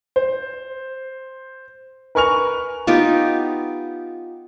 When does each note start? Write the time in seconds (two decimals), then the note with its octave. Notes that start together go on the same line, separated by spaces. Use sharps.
0.16 C5
2.15 A#4 B4 G#5 C#6 F6 F7
2.87 B3 D#4 F4 G4